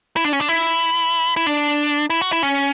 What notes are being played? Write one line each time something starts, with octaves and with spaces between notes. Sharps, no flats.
E4
D4
C#4
D4
E4
E4
D4
E4
F#4
E4
C#4